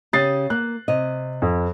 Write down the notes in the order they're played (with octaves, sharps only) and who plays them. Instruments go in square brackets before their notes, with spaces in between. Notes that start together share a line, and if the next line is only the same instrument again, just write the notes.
[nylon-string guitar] C#3 G4 [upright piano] D#6 A6 C7
[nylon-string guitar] A#3 [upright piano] F#6
[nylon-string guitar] C3 D#5
[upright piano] F2